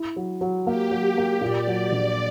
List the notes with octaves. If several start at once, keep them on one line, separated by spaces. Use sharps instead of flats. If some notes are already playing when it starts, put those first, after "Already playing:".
Already playing: E4
F#3
F#3
A#3 G4
F#3
A#3
A#2 D5
F#3
A#1